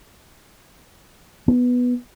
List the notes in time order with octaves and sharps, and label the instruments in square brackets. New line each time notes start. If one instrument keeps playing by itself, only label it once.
[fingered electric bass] B3